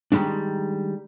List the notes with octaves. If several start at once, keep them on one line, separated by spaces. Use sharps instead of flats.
D#3 F3 G3 G#3 D4